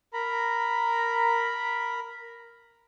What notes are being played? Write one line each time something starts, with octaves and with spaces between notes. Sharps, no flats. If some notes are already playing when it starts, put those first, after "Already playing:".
A#4 A#5 B5